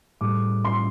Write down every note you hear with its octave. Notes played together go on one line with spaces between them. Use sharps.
A2 G3 D6
C6